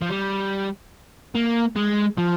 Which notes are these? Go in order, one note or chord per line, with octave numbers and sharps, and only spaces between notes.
F3
G3
A#3
G#3
F3